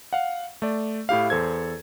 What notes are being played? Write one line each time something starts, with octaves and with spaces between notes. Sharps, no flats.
F5 F#5
A3 D5
A2 E4 G4 F5
E2 A4 C5 G#6